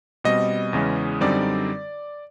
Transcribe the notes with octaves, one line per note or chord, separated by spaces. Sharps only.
B2 G3 C4 D#5
E2 C#3 E3 G#3 C#4
F#2 D3 G3 C4 D#4 D5